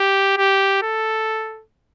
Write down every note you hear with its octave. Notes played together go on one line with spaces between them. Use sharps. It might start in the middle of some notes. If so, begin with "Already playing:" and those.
Already playing: G4
G4
A4